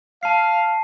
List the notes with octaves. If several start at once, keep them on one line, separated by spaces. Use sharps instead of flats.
F5 A5 C7